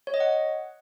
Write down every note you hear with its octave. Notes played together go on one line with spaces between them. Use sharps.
C#5
D#5
F#5